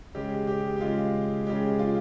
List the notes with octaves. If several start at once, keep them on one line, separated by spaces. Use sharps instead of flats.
C#3 G#3 G4
G4
G4
C#3 G#3 F4
C#3 G#3 G4
F4